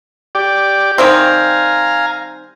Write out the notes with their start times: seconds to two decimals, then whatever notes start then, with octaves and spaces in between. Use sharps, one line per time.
0.35 G4 D5
0.98 D#3 G3 C4 F5 G#5 A#5